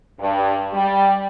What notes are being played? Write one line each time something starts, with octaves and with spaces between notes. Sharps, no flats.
G2
G3